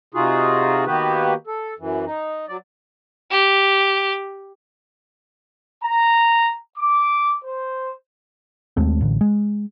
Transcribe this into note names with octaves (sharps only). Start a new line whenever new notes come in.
C3 D#4 F4 F#4 G#4
D#3 A#3 B3 F#4 G4 B4
A4
F#2 E3
D#4
F#3 D5
G4
A#5
D6
C5
D#2 G#3 A3 C4
A1 D3
G#3